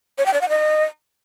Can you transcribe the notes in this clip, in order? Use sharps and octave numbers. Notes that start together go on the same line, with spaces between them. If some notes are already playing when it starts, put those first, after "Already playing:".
C#5
G5
D5
F#5
D#5